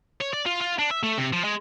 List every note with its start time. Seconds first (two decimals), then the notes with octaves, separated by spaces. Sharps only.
0.20 C#5
0.33 D5
0.46 F4
0.61 F4
0.79 D4
0.91 E5
1.03 A3
1.18 C3
1.33 F3
1.44 G#3